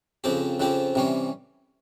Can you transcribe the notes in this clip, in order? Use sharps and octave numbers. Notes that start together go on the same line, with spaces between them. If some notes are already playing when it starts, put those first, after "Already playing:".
F2 C#3 F3 C4 G4
F2 C#3 F3 C4 G4
C3 E3 G3 C#4